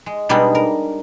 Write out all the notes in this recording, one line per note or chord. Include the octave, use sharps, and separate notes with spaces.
G#3
B2 G3 G#3 B3 D4 D#4
A#4